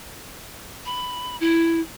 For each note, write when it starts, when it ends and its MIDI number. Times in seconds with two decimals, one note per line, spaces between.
0.86 1.36 83
1.40 1.81 64